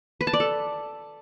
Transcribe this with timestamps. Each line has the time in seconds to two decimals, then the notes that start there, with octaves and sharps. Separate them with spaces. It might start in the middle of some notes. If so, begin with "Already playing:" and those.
0.21 B4
0.27 A5
0.33 D5
0.40 A4